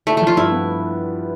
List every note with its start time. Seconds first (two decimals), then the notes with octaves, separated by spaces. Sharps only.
0.07 A3 E4
0.17 F3 A3
0.27 F4
0.37 G2 E4
0.52 B3